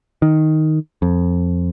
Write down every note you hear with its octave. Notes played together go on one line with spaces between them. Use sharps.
D#3
F2